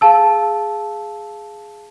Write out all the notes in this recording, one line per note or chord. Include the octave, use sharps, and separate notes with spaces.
G#4 F5 A5 E6